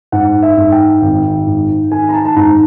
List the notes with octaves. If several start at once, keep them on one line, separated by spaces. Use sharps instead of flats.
G#2 F#5
E5
G#2
G5
G#1
G#2
D#3 G#5
A#5
A5
A5
G#2 A#5